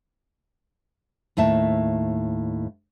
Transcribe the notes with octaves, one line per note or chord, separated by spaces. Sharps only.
D#2 A2 E5 A5